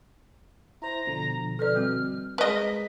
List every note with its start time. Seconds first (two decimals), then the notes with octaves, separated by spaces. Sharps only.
0.82 E4 C5 A#5
1.07 B2 D3 F3
1.59 A4 B4 D5 F6
1.75 G3 C4 F#4
2.38 G#3 A#4 B4 D#5 B6